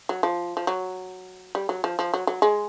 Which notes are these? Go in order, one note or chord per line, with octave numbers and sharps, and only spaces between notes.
F#3
F3
F3
F#3
G3
F#3
F3
F3
F#3
F#3
G#3